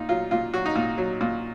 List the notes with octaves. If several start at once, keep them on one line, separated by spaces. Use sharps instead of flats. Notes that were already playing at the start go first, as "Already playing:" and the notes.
Already playing: A#2 D#4
F#3 F4
A#2 F4
F#3 F#4
D#4
A#2
F#3
A#2